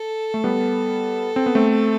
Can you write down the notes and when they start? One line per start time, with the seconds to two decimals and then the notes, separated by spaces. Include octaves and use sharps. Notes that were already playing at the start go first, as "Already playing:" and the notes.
Already playing: A4
0.34 A3
0.44 G3 B3
1.36 C4
1.46 B3
1.55 A3 C4